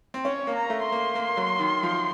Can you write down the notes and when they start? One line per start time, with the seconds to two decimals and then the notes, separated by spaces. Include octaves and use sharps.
0.14 C4
0.25 C#4 C#5
0.47 A#3
0.56 A#5
0.70 A3
0.85 C6
0.92 A#3
1.15 A#3
1.37 F#3
1.59 D#3
1.83 F3